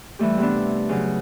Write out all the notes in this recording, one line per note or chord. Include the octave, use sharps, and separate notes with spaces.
E3 G3 A3 G4
C3 A3 B3 D4
C#3 F#3